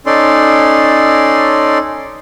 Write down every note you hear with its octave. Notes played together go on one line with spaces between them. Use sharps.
C#4 D#4 A4 D5 C6